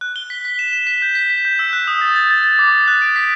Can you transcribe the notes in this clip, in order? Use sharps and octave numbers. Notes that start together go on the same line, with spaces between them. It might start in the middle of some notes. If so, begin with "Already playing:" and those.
F#6
G7
B6
B6
E7
E7
B6
G6
B6
B6
G6
E6
F#6
D#6
A6
A6
A6
A6
D6
D6
F#6
D7
B6